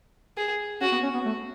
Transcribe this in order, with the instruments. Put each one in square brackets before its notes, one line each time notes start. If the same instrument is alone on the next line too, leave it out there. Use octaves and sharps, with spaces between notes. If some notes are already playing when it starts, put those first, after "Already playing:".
[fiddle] G#4
[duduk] C#4 [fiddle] F#4
[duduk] B3
C#4
B3
A3